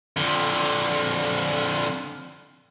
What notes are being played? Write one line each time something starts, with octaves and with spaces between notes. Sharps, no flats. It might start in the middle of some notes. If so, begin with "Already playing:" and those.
F2 D3